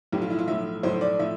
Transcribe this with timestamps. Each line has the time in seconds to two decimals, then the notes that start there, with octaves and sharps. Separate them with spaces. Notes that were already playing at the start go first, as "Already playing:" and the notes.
0.12 B1 A2 F3 G4
0.22 F4
0.30 E4
0.39 F4
0.48 B1 A2 F3 E5
0.83 B1 A2 F3 C5
1.01 D5
1.19 A2 F3 E5